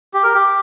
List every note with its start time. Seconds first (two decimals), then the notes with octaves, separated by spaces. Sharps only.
0.14 G4
0.23 A#4
0.35 G4